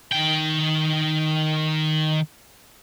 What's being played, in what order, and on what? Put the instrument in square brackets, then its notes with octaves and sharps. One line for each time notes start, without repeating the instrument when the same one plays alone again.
[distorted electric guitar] D#3 G5